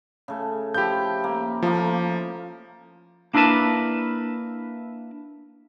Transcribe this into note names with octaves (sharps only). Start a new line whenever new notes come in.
C#3 A3
F3 E4 G4 G6
A#3
F3 A3 A#3
A#3 D4 E4 A#4 B4 A5